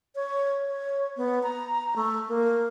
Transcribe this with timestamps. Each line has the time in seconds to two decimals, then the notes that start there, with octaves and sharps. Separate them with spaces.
0.15 C#5
0.68 C#5
1.17 B3
1.43 A#5
1.96 A3
2.28 A#3